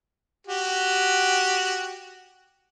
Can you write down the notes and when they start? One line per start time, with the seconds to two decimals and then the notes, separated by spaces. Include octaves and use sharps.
0.47 F#4 G4